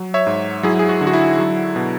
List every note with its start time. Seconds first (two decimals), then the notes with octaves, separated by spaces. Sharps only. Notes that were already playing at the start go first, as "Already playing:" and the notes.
Already playing: F#3
0.14 C#5 E5
0.27 G#2
0.63 F#3 E4 G#4
0.79 G#4
0.89 F#4
1.01 D3
1.07 F#4
1.13 E4
1.39 F#3
1.76 B2